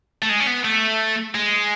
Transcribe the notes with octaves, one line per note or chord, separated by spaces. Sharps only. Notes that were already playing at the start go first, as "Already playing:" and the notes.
A3
G#3
C#4
B3
A3
G#3